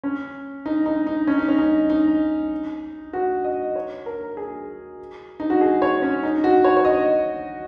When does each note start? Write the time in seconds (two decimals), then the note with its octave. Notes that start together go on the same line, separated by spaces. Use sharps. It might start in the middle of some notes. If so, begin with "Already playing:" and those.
0.04 C#4
0.66 D#4
0.86 D#4
1.07 D#4
1.27 C#4
1.38 D#4
1.48 C#4
1.58 D#4
1.90 D#4
3.13 F#4
3.44 D#5
3.76 C#5
4.06 A#4
4.37 G#4
5.40 D#4
5.50 F#4
5.61 G#4
5.82 C#5
6.02 C#4
6.23 D#4
6.44 F#4
6.64 C#5
6.77 C#5
6.85 D#5